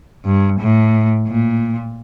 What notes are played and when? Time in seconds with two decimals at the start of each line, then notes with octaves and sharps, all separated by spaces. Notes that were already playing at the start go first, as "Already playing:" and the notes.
0.25 G2
0.60 A2
1.28 A#2